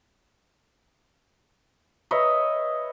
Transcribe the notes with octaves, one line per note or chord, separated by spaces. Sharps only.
B4 C#5 D#5 E5